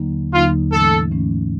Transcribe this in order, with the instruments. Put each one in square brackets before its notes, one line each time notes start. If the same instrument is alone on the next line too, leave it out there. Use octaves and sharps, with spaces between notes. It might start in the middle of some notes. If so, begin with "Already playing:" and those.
Already playing: [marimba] D#2 D3 F#3 A#3 D#4
[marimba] D#2 D3 F#3 A#3 D#4 [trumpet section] F4
[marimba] G#2 E3 A3 C#4 [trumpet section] A4
[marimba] G#2 E3 A3 C#4